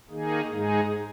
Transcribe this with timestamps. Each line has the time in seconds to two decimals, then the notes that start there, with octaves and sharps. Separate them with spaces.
0.09 D#3 A#3 D#4 G#4
0.49 G#2 G#3 D#4 G#4